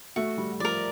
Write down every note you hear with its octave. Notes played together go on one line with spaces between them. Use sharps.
A3 F#4
G3
F3 A#4 D5